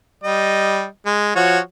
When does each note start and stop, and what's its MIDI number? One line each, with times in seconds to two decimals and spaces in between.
0.23 0.85 55
0.23 0.85 75
1.06 1.34 56
1.36 1.59 53
1.36 1.59 66
1.36 1.59 73